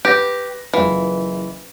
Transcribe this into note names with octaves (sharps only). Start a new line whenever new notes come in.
G4 B4 A#6
F#1 E3 F4